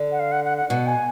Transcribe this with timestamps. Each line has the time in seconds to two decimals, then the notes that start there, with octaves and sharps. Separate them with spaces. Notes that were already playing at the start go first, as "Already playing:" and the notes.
Already playing: D3
0.12 F#5
0.19 F5
0.32 F#5
0.44 F#5
0.58 F#5
0.69 B2 F#5
0.87 G#5